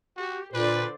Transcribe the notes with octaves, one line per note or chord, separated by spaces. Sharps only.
F#4 G4
A#2 D3 F4 B4 C5 D5